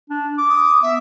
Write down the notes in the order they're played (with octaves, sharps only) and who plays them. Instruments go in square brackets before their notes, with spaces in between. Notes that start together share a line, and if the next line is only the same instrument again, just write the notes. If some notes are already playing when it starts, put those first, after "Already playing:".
[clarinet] D4
D6
[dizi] D#6
[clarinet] B3 [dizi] E5